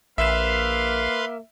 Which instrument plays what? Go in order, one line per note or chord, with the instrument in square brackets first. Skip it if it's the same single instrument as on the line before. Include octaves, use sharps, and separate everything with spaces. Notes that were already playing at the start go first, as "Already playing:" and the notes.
[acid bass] A#1 [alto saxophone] A#3 [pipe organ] B4 F5 C6 [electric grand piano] E5 E7